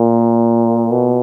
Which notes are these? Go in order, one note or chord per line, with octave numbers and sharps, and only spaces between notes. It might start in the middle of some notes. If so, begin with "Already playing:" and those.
Already playing: A#2
B2